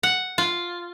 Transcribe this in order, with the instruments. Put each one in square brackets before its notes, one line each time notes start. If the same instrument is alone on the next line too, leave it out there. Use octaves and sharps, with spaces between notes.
[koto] F#5
F4